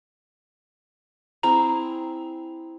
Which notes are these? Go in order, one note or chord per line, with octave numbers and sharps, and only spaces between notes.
C4 E4 G#4 A#5